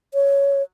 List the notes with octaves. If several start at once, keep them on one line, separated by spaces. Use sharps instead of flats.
C#5